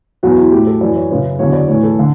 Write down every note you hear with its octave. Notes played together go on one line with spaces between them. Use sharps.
E2 B2 F#3 F#4
E4
A2 F#3 G4
A4
F#2 E3 D5
C#5
F#2 C#3 F#3 B4
E2 D3 F#3 C#5
D5
A2 E3 C#5
A4
D3